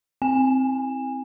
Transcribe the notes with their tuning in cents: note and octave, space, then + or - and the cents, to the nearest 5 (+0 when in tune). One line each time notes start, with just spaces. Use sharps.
C4 +0 G#5 -20